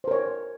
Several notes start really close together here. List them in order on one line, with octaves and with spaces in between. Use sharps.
C5 A#4 C#5